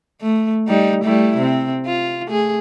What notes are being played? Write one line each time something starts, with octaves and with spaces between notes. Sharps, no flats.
A3
G3 D#4
G3 A3 E4
C3 C4
F4
A3 G#4